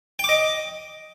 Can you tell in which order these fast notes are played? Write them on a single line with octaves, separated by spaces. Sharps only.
G5 D6 D#5